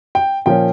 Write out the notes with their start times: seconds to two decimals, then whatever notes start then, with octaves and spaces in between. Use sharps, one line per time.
0.15 G5
0.46 A#2 F3 A#3 C#4 G5